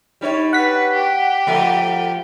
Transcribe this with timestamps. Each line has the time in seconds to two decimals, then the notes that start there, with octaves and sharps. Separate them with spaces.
0.21 G3 D#4 C#5
0.53 B4 F#5 B6
0.93 G4
1.47 F3 A3